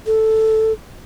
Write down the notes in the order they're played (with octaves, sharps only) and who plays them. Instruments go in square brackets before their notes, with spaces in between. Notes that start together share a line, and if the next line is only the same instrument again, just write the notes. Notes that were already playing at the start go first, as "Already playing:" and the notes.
[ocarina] A4